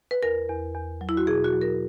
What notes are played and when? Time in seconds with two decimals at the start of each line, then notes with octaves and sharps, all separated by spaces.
0.11 B4
0.23 E2 A#4
0.49 E2
0.75 E2
1.01 F#3
1.09 E4
1.17 F#4
1.27 B2 G#4
1.44 F#4
1.53 F#3
1.61 A#4